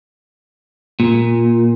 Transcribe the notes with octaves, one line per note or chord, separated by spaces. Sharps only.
A#2